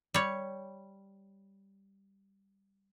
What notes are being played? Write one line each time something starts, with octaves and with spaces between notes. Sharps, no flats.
G3 C#5